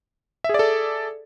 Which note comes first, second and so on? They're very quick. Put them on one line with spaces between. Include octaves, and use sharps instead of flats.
E5 G#4 D5 A4